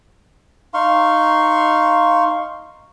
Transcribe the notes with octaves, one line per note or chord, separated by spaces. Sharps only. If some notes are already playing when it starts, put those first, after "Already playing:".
D#4 F5 C6 C#6